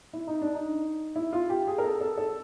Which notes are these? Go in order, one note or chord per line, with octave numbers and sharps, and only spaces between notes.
E4
D#4
D4
D#4
E4
F4
G4
G#4
A#4
A4
A4
A4